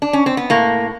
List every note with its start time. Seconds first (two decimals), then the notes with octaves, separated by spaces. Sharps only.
0.02 D4
0.13 C#4
0.26 C4
0.37 B3
0.50 A2 A#3